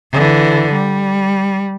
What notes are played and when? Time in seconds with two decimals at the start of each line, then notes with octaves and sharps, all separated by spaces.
0.12 D3 E3
0.72 G3